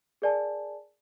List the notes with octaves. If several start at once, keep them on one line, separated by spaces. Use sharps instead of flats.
G#4 A#4 D5 G#5 A5